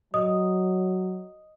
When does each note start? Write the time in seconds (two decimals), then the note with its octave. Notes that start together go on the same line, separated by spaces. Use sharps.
0.14 F#3 D#5 D#6